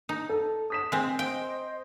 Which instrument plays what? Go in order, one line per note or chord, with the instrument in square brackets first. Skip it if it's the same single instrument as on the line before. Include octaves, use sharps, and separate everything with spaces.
[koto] D#4
[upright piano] A4
D#6 B6 E7
[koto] G#3 C4
[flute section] C5 D#5 [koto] G5